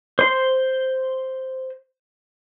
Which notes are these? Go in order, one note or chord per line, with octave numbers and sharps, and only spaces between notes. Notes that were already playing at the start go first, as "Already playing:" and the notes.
C5 C6